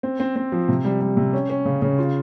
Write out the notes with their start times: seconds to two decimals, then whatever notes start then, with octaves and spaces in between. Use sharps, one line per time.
0.03 C4
0.20 C4
0.36 C4
0.52 F3
0.69 C3
0.85 G3
1.01 G3
1.17 C3
1.33 C#4
1.50 C#4
1.65 C#3
1.82 C#3
1.98 F4